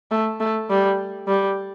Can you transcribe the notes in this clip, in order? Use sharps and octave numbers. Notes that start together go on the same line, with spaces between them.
A3
A3
G3
G3